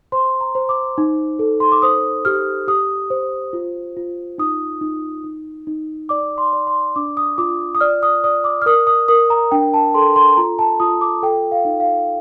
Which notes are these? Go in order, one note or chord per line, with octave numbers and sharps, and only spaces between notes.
C5 C6
A#5
C5
D6
D#4
A4
C6
D6
C5 D#6
G4 F6
G4 D#6
C5
F4
F4
D#4 D#6
D#4
D#4
D#4
D5 D6
C6
D5
C6
D4 D6
D#6
F4 D6
D#6
D5 F6
D#6
D5 D#6
D6
F6
A#4 D#6
D#6
A#4 D#6
A#5
D4 G5
A5
A4 C6
C6
F4 A#5
A5
F4 D#6
D6
A4 G5
F5
D#4
F5